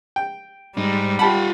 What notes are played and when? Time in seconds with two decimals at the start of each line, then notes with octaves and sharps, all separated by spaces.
0.16 G5
0.77 G#2 G3 D#4
1.19 F4 G4 F#5 A5 B5